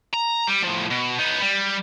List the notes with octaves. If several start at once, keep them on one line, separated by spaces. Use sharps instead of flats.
A#5
G3
A2 F3
B2
B3 D#4
G3